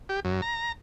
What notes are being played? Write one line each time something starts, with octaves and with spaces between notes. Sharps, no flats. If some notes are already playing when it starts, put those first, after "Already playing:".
G4
F#2
A#5